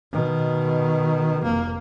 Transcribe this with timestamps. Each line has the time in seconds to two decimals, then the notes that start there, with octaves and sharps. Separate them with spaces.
0.12 B2 D#3
1.42 F1 A#3